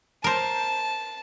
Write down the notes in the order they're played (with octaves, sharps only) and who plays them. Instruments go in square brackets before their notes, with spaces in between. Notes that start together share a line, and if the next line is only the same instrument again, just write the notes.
[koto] A#4 C5 [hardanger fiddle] A5